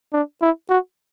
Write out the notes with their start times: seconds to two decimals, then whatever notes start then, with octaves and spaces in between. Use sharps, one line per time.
0.13 D4
0.41 E4
0.69 F#4